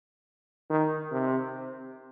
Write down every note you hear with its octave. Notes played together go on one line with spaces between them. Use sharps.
D#3
C3